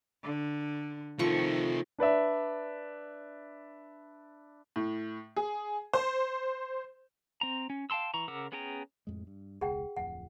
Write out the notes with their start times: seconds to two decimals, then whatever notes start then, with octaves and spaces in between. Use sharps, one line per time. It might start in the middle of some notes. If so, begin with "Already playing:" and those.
0.24 D3
1.19 C3 D#3 F3 A3 C#6
1.98 D4 B4 D5 E5
4.76 A2
5.36 G#4
5.94 C5
7.41 C4 A#5
7.70 C#4
7.90 F5 G5 A5 C6 E6
8.14 E3 A#5 C#6
8.28 C#3 A#4 F#5 D6 E6
8.52 B3 C#4 G#4 G5 A#5
9.07 F2 A2 G#3
9.27 G2
9.61 E1 C#2 G#4 F#5 G5
9.96 D1 F2 F3 F#5